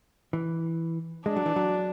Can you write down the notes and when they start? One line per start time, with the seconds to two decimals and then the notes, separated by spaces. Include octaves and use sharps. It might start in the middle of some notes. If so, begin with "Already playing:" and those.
0.33 E3
1.26 G#3 D4
1.36 F#3
1.46 E3
1.56 F#3